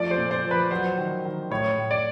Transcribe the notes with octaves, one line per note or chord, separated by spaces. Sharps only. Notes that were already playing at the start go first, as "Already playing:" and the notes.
Already playing: F3 A3 D5
C5
A#2
C5
F3
B4
F#3 C5
D#3
D#3
A2 C#5
A2
D5